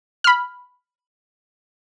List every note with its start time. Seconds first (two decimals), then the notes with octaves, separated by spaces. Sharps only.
0.24 B5 F6